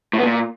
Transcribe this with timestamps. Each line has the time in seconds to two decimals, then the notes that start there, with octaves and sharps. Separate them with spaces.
0.13 A2
0.18 B3
0.24 A#2